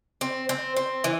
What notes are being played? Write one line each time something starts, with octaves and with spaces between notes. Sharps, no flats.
C4
C4
C4
E3